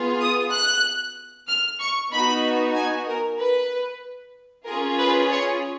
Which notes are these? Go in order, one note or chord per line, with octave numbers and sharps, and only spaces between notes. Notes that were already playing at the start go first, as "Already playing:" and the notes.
Already playing: B3 F4 G#4
D#6
F#6
F6
C#6
B3 D#4 F#4 B5
G#5
A#4
B4
C#4 F4 G#4 A#4
B4
C#5